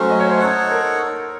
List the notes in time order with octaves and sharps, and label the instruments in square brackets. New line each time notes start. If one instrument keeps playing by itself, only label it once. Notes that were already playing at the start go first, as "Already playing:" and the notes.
Already playing: [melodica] F#3 A3 C#4 [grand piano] A4 C5
[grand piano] D#5
C#5
C5
[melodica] D#4 A4 C#5 F#5
[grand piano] A#4